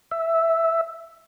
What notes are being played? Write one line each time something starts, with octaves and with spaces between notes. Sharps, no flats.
E5